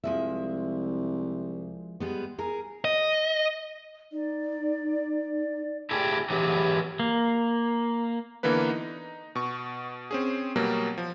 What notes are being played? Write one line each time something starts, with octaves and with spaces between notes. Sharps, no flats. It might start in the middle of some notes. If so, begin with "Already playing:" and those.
C2 F3 G#3 E5
G3 G#3 B3
G#4 A#4
D#5
D#4 D5
A3 E4 G4 G#4 G5
E3 F#3 G#3 B3 E4 G4
A#3
D3 E3 A#3 B3 B4
D#4
B2 C#6
C4 C#4 G#4
B2 F#3 G3 A#3
F3